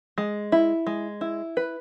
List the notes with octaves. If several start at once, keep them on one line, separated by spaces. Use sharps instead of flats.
G#3
E4
G#3
E4
B4